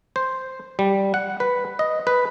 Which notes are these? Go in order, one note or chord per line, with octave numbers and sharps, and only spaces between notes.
C5
G3
F#5
B4
D#5
B4